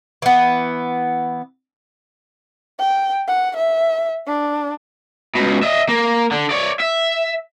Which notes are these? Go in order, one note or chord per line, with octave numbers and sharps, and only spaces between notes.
E3 B3
G5
F#5
E5
D4
C#2 B2
D#5 E5
A#3
D3
C#5 D5
E5